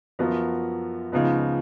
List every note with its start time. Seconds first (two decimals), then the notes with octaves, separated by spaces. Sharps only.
0.19 F#2 F3 B3 F#4 A#4
1.12 C#2 C#3 F3 B3 D#4